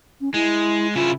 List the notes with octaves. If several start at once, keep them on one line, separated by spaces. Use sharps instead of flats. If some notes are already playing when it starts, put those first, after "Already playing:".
C#4
G#3 E4
C#3 E4 F4